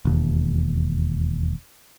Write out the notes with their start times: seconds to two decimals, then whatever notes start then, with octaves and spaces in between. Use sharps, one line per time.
0.05 E1 D#2